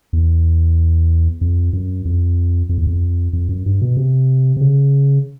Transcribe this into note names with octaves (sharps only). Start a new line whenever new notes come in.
E2
F2
F#2
F2
F2
E2
F2
F2
F#2
G2
B2
C3
C3
C#3